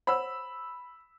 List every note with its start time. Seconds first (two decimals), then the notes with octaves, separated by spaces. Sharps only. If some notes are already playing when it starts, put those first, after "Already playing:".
0.07 C5 C#5 F#5 B5 E6